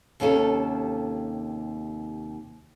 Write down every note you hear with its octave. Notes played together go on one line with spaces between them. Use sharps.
D#2 C3 C#4 F4 F#4 A4